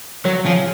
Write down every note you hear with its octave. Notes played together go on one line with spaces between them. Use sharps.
F#3 C#5
F3 G#4